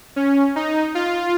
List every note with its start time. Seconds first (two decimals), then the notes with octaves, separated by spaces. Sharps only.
0.16 C#4
0.56 D#4
0.95 F4